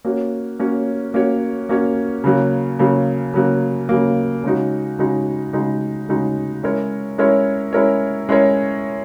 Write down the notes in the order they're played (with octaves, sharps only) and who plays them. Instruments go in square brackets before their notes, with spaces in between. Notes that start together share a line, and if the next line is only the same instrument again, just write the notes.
[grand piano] A#3 C#4 F#4 C#5
A#3 C#4 F#4 C#5
A#3 C#4 F#4 C#5
A#3 C#4 F#4 C#5
C#3 F#3 A#3
C#3 F#3 A#3
C#3 F#3 A#3
C#3 F#3 A#3
C#3 G#3 D#4 F#4
C#3 G#3 D#4 F#4
C#3 G#3 D#4 F#4
C#3 G#3 D#4 F#4
G#3 C#4 E4 A#4 C#5
G#3 C#4 E4 A#4 C#5
G#3 C#4 E4 A#4 C#5
G#3 C#4 E4 A#4 C#5